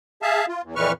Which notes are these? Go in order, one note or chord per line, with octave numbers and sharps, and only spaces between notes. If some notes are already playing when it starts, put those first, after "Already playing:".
G#4 E5 F5 A5
F4
E2
F2 A#2 E3 B4 C#6 F6